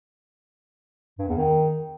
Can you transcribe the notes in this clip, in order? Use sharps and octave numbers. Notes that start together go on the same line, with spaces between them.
G2
E2
D#3